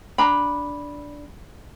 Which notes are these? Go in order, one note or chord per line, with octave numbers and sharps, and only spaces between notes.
D4 A#5 B5